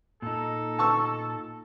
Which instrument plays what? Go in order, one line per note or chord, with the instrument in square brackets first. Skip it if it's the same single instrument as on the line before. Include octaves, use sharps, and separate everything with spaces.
[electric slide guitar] A#2 D#4 [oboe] A4
[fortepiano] A5 C#6 E6